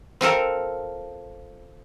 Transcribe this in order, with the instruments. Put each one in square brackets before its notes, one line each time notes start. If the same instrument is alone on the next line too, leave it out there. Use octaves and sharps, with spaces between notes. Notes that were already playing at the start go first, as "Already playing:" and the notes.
[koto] C4 F4 A4 A#4